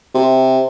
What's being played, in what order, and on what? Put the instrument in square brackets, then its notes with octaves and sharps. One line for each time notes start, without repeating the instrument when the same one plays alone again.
[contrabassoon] C3